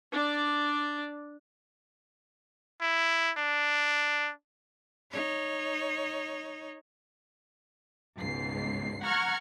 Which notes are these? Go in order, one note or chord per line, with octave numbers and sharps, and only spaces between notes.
D4 D5
E4
D4
D#4 C#5
C#2 G#2 B2 C7
F#5 A#5 C#6 F6 G#6